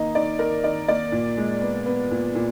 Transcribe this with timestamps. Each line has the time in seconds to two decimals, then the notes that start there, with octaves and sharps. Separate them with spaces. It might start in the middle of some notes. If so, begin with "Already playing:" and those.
Already playing: D#3 A#3 D#5 A#5
0.15 D#3 D5
0.39 D#3 A#4
0.63 D#3 D5
0.88 A#3 D5
1.12 A#2
1.37 G#3
1.61 B3
1.86 B3
2.11 A#2
2.35 A#2